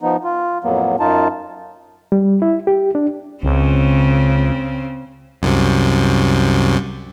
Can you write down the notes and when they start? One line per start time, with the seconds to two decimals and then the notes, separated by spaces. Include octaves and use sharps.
0.01 F3 B3 D#4
0.24 F4
0.64 F2 A2 F#3 A#3 B3
1.00 F#2 D#4 F4 A5
2.12 G3
2.42 E4
2.67 G4
2.95 D4
3.43 C#2 C#3 C4
5.42 C2 F#2 C3